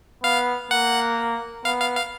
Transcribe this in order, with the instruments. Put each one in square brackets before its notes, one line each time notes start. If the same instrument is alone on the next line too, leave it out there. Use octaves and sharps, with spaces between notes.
[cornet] B3 [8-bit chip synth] F5
[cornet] A#3 [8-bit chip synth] F#5
[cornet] B3 [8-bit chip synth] F5
[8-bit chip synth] F5
F5